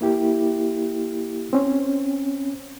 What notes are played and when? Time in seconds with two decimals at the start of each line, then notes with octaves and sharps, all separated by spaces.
0.01 A#3 E4 G4
1.53 C4 C#4